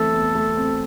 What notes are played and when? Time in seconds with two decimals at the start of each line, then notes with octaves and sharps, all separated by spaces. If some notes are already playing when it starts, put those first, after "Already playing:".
Already playing: E3 A3 C4 A4
0.13 E2
0.35 A3
0.57 C4